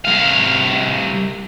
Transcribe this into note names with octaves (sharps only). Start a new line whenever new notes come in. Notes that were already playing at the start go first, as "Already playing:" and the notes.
C2 F5